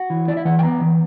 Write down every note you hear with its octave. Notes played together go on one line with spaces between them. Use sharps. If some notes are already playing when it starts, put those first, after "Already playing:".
Already playing: F#4
E3
E4 D5
E5
E3 F#5
G5
B3 A#5
E3